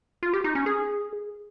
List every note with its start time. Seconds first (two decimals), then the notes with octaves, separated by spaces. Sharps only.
0.23 F4
0.33 G4
0.44 D#4
0.55 C#4
0.66 G#4